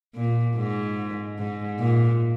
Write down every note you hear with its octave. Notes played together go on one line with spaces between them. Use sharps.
A#2
G#2
G#2
A#2